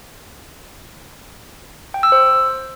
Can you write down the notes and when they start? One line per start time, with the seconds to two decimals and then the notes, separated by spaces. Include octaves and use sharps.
1.94 G5
2.03 E6
2.12 C5